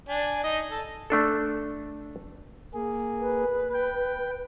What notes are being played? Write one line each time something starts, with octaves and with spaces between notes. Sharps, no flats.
D4 G#5
D#4 D#5
A4
A3 D4 A4
A#3 G#4
B4
G5